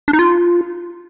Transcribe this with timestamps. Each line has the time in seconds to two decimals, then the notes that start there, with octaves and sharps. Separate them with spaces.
0.08 D4
0.13 D#4
0.19 F4